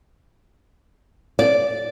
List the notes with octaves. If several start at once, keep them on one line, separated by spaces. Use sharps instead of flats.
D5